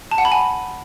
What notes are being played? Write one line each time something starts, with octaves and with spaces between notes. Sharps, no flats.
A5
F#5
B5
G#5